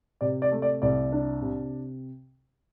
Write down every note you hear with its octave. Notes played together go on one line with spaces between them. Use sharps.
C3 D5
D5
A3
D5
C2 D5
D4
C3